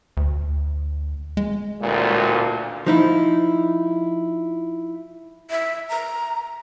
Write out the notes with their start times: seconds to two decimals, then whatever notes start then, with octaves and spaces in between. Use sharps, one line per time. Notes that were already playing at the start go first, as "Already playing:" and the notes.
0.17 D2
1.37 G#3
1.82 A1 D2 A#2
2.87 F3 D#4 E4
5.50 E5
5.89 A#5